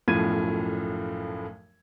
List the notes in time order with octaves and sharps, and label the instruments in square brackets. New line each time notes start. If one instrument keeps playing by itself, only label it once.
[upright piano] B1 F#2 A2 F3 G#6 D#7